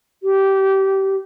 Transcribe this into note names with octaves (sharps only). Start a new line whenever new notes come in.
G4